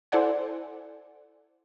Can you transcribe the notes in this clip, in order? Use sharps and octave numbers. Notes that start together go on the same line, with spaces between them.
E4 A4 C5 D5 F#5 G#5